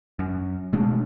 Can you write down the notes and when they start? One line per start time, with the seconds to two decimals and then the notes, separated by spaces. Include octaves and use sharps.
0.19 F#2
0.73 B2 G#3 A3 D4